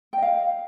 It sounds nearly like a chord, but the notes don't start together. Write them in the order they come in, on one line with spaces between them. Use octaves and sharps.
G5 D#5 F5